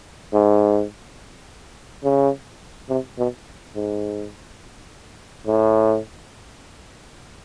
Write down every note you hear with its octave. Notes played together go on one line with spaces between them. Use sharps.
G#2
C#3
C3
B2
G#2
A2